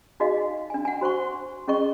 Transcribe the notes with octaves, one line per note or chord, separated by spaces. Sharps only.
D#4 F#4 G#4 D#5 F5 G#5
D4 G#5
F#5 G#5
F#4 C5 C6 C#6
C#4 G#4 D#5 C#6